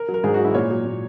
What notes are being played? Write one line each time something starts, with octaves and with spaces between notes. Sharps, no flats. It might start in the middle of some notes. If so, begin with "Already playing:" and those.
Already playing: A#4
F#3
A#4
G#2 G#4
F#4
F#3
E4
A#2 C#5
F#3
A#2